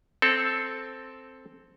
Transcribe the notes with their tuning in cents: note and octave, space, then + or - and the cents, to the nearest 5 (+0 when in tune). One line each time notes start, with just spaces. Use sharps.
C4 +0 A4 +0